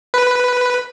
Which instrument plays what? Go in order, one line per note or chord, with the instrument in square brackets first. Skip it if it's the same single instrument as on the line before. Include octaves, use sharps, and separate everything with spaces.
[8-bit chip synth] B4